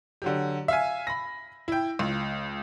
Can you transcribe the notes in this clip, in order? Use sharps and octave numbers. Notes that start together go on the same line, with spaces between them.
D3 F#3 G4
E5 F5 G#5
B5 A#6
E4 G5
C#2